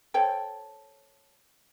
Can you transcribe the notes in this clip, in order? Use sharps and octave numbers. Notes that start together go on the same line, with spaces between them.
A4 C5 C#5 G5